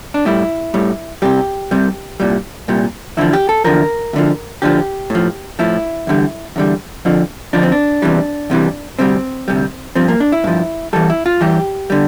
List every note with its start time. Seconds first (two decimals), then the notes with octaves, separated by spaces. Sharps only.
0.14 D4
0.25 A2 G3 E4
0.74 A2 G3
1.22 C2 C3 G3 G4
1.71 C2 C3 G3
2.20 C2 A#2 G3
2.68 C2 A#2 G3
3.17 E2 D3 F3 E4
3.33 G4
3.49 A4
3.64 E2 D3 F3 A#4
4.13 D2 D3 F3
4.62 D2 D3 F3 G4
5.10 A2 F3
5.59 A2 F3 E4
6.07 E2 D3 G3
6.56 E2 D3 G3
7.05 F2 D3 F3
7.53 F2 D3 F3 D4
7.63 C4
7.72 D4
8.02 E2 C3 E3 G3
8.50 E2 C3 E3 G3
8.99 D2 C3 G3 C4
9.48 D2 C3 G3
9.95 G2 F3 C4
10.08 A#3
10.20 D4
10.32 E4
10.44 G2 F3
10.93 E2 E3 G3 A4
11.10 E4
11.26 F4
11.41 E2 E3 G3 G4
11.90 D3 G3